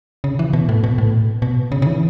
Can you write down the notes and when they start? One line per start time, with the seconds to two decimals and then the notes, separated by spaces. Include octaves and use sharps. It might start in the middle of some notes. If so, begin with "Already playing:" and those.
0.24 C#3
0.39 E3
0.53 B2
0.69 A2
0.84 B2
0.98 A2
1.42 B2
1.72 C#3
1.82 C#3
1.86 E3